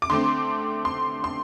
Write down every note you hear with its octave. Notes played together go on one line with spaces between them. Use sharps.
D6
D3 A3 C4 C6
C6
C6